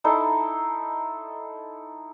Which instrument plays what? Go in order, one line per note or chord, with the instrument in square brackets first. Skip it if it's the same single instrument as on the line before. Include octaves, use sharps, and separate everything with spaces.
[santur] D#4 E4 A4 C5